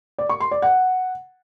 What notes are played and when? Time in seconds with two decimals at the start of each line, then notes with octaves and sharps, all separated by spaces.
0.18 D5
0.29 C#6
0.40 C6
0.51 D5
0.62 F#5